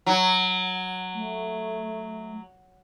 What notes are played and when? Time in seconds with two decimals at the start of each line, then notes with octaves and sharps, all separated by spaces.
0.06 F#3
1.14 A3